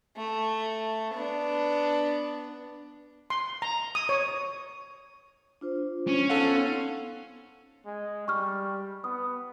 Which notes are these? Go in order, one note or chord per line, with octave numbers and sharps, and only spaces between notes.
A3
B3 D4
C6
A#5
D#6
C#5
D4 F4 C5
C#4
B3 D#4 A4 F5 F#5 C6
G#3
G3 C#6 F6
B3 D#6